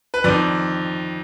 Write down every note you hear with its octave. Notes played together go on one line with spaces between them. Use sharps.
B4
F2 D#3 D5